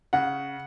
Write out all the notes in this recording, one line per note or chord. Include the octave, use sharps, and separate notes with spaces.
C#3 F#5